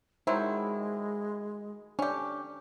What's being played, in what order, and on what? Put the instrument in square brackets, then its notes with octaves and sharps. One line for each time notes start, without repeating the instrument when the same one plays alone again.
[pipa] D#3 F#3 E4 [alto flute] G#3 [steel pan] C5
[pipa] C#4 G4 [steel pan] D4